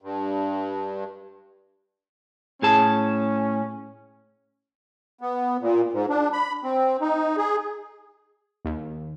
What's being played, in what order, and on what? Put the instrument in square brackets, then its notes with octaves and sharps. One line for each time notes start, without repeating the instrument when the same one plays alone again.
[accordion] G2
[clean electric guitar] A2 G#4 A5 [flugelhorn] C#4
[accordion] B3
A#2
G#2
D4
B5
C4
D#4
G#4
[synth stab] D#2